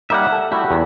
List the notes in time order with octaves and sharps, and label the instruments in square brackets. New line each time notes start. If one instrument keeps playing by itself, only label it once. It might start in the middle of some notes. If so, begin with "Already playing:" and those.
[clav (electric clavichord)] G3 A#3 D#4 [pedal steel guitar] E5 F#5
[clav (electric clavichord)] A4
[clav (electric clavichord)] G3 A3 E4 [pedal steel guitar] F#4 G4
[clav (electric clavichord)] E2